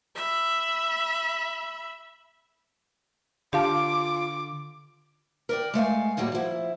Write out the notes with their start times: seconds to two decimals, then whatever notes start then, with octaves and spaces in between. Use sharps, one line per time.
0.15 E5 B5
3.53 D3 F4 G4 F5 A5 D6
5.49 A#4 D5 G5
5.74 G#3 A3 F5 G#5
6.17 A2 F#3 G3 A#3 G#4
6.32 F3 E4